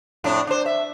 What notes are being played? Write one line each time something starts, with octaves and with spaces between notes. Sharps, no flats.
F2 A2 D4
D4 C5
E5